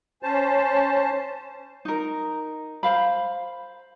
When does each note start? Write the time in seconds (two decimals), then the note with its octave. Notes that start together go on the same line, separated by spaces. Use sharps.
0.23 C#4 C5 A5
1.85 D#4 A#4
2.83 C5 F5 B5